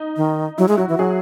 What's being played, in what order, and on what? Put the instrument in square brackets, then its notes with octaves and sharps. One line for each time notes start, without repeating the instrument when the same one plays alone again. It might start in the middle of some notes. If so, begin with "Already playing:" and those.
Already playing: [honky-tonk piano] D#4
[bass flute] D#3
[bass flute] F#3 [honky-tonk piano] E4
[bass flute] G#3
[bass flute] F#3 [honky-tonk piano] F#4
[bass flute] E3
[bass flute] F#3 [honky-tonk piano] G#4